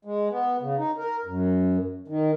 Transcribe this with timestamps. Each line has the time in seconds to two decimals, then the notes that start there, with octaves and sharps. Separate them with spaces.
0.05 G#3
0.30 B3
0.61 C#3
0.78 D#4
0.98 A#4
1.25 F#2
2.08 D#3